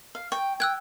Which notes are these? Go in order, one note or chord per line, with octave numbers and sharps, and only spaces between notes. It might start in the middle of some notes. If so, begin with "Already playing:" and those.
F5
G5 C#6
G5 E6 F#6 G#6